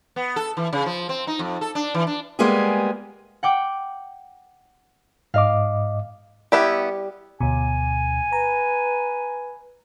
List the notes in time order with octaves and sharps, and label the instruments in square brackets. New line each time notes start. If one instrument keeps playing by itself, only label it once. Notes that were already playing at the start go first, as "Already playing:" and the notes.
[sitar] B3
A4
E3
C#3
F3
C4
D#4
F2
A4
D4
E3
D4
[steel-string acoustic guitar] G3 G#3 A#3 B3 G4 G#4
[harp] F#5 G5 D6
[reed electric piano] G#2 D#5 D6 [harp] F5
[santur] G3 [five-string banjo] B3 E4 G4
[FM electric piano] D2 B2 [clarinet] G#5
[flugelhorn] B4 [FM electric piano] A#5